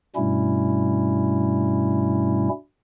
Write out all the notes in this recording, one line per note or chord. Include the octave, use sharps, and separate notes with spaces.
G2 B2 G3 A3 C#4 E4